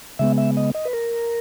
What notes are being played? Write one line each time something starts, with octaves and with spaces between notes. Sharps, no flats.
C#3 G#3 B3 E5
E5
D#5
D#5
B4
A#4